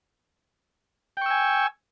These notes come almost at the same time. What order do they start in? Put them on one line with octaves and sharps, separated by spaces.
G5 C#6 E6 G#5